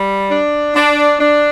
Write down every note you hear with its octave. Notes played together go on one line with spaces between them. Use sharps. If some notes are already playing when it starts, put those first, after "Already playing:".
Already playing: G3
D4
D4
D4